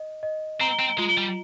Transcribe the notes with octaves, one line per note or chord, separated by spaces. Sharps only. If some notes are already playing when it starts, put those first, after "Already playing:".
Already playing: D#5
D#5
C4 A#5
C4
G#3 F4
G3